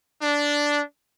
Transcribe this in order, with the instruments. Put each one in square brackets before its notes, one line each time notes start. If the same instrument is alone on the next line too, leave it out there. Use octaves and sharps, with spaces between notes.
[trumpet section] D4